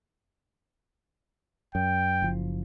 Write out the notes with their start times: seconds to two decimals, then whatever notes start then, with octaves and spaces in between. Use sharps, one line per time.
1.75 F#2 G5
2.22 F#1 F3